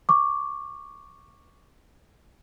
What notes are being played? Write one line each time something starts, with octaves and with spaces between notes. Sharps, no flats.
C#6 D6